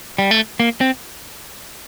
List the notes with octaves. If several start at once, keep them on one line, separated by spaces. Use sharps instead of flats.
G3
A3
A#3
C4